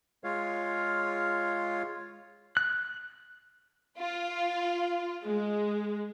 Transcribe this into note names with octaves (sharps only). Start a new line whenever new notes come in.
G#3 F4 C#5 F5
F#6
F4
G#3